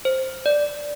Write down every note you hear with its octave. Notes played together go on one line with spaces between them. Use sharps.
C5
D5